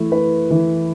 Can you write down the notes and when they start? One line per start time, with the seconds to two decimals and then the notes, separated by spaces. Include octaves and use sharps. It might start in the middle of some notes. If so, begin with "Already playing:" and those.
Already playing: E3 A3 E4
0.12 B4
0.50 E3